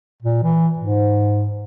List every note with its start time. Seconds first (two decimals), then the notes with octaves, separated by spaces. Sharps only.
0.22 A#2
0.43 E3
0.79 G#2